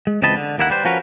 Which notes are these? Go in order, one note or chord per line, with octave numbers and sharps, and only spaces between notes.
G#3
C#2 E3 C4 D#5 A5 B5
D3
D#2 A#3 E4 F#5
G3 B4 C5
F3 C#4 F#4 A#4 B4